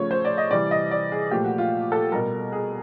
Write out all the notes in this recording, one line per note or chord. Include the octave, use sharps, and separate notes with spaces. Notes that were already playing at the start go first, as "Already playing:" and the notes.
Already playing: C#3 F3 A3 C#5
C5
D5
D#5
C3 E3 G3 D5
D#5
D5
G#4
A#2 F3 A3 G4
F#4
F4
A4
B2 G3 A#4
G#4